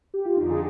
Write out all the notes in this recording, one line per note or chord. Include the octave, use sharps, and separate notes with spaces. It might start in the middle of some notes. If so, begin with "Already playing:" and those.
G4
F4
F2 D3 D#4
G#4